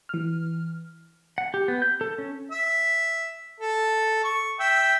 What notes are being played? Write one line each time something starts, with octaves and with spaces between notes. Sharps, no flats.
E3 F6
F#5
G4
B3
G6
A4
C#4
E5
A4
C#6
E5 G5 E6